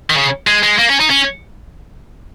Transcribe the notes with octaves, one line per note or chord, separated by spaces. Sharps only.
D#3
C#3
G#3
G#3
A#3
C#4
D#4
C#4